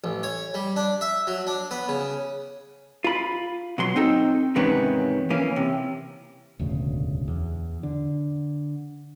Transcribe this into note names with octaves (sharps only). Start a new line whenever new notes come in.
A1
C#5
G3
D4
E5
F#3
D4
B3
C#3
F4 B5
B2 F#3 C6
C4 D#4 A4
E2 G#2 C3 D#3 B3 C#4
E3 A#3 C#4
C3
E1 D2 A2 C#3
E2
D3